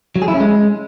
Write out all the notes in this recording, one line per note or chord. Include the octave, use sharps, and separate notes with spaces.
F#3
G#4
E4
C#4
G#3